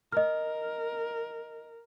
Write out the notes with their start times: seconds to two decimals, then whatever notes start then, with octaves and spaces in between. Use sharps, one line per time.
0.12 A#4 D#5 F6